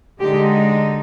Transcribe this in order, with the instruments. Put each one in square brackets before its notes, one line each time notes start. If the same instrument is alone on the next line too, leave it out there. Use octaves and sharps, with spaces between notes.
[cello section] D3 G#3 D#4 G4